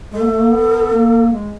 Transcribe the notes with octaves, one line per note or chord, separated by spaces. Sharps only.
G#3 A4
A#3
A3
A#3
B3
A#3
G#3